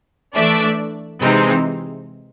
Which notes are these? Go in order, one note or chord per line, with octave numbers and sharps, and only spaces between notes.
E3 A3 D4 D5 E5
C3 E3 G#3 C4 D#4